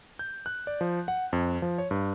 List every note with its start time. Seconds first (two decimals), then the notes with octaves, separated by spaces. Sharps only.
0.19 G6
0.46 F#6
0.67 D5
0.81 F3
1.08 F#5
1.33 F2
1.62 F3
1.78 C#5
1.91 G2